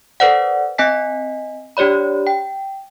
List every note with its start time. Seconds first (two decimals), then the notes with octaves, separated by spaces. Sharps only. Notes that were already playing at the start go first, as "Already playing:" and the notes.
0.20 A4 B4 C5 D5 F#5
0.78 C4 D#5 G#5 B6
1.77 D4 G4 C#5 D5 B5
2.27 G5